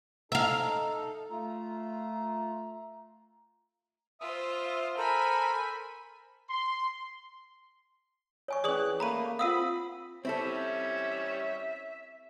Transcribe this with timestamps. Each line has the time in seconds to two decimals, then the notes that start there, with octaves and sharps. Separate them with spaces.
0.32 D#4 A4 E5 F5 A#5
1.30 A3 F4 A#5
4.21 F4 C5 E5 D#6 E6
4.97 A4 A#4 C5 G#5 B5
6.50 C6
8.48 C#5 G#5 C#6
8.64 E3 C#4 G#4 D5 D#6 F#6 F#7
9.00 A3 A#3 A#5 B5 D#7
9.39 C4 F4 F5 F#5 B5 D#6 E6 D#7
10.25 G3 C4 C#4 E4 A4 C#5 E5